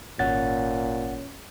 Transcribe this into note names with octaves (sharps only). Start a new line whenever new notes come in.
G#1 A#2 C#4 F#5 A6